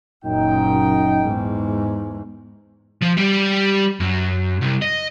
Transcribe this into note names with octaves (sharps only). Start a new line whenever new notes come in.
F#1 F#2 A#2 D#4 G5
E2 G#2
F3
G3 D5
F#2
C2
D#5